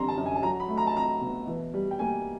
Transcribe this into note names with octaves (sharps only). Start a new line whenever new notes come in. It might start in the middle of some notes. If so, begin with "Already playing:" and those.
Already playing: D3 G3 C4 A#5 C6
A5
F#2
G#5
A5
F#3 A#5
B5
A3
A#5
A5
C4 A#5
B2
E3
G3
G5
A#3 G#5